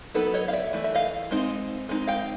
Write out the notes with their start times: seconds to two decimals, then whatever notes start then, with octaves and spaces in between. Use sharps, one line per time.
0.14 F#3 B3 D#4 A4 B4
0.34 C#5 D#5
0.48 F5
0.53 D5 E5
0.73 E3 A3
0.84 E5
0.95 D#5 F5
1.31 G#3 C4 D#4
1.89 G#3 C4 D#4
2.07 F5 G5